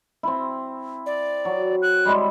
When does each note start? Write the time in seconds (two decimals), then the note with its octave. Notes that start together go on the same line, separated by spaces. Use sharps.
0.23 C4 E4
1.06 D5
1.45 F#3
1.82 F#6
2.05 G3 G#3 E4